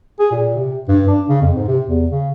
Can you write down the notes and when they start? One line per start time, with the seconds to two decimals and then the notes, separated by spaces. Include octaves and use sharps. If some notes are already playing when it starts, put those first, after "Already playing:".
0.19 G#4
0.32 A#2
0.56 C3
0.88 G2
1.08 D4
1.29 C#3
1.42 F2
1.56 G#2
1.68 C3
1.86 E2
2.11 C#3